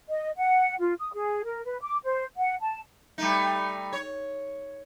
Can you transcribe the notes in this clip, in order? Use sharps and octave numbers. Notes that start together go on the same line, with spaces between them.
D#5
F#5
F4
D#6
G#4
A#4
B4
D6
C5
F#5
A5
G3 A3 D#4
C#5